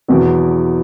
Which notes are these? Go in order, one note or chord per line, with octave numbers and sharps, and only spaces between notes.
E2 B2 F#3